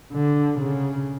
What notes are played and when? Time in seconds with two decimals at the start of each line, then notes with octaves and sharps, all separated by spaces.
0.13 D3
0.59 C#3